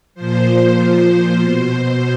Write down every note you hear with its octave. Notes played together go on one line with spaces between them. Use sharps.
A#2 F3 C5
B2 C5